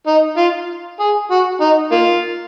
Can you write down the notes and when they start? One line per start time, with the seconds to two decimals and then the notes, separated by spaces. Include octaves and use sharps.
0.07 D#4
0.37 F4
1.00 G#4
1.31 F#4
1.61 D#4
1.92 A#3 F4